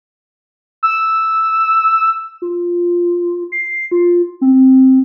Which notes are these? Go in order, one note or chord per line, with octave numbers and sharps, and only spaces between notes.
E6
F4
C7
F4
C4